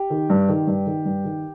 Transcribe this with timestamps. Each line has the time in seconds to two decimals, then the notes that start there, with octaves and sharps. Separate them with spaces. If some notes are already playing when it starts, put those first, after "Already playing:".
Already playing: G4
0.10 D#3
0.30 G2
0.49 D#3
0.67 G2
0.86 D#3
1.05 G2
1.25 D#3